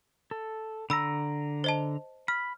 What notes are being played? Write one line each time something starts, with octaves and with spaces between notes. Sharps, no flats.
A4
D3 A#5 B5 E6
C5 D#5 A5
B5 F6